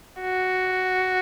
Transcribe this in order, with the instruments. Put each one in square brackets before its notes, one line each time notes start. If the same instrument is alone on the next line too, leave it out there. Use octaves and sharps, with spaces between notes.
[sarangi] F#4